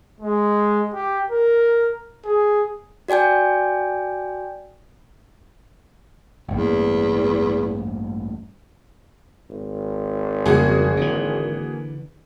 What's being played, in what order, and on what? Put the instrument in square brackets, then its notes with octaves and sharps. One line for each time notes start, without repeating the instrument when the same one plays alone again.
[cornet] G#3
G4
A#4
G#4
[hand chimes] F#4 D5 G5 G#5 G6
[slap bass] A1 G2 A#3 [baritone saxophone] E2
[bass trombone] G#1
[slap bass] F2 C#3 G3 [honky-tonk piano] A#3 F#4 G#4
[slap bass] D3 E3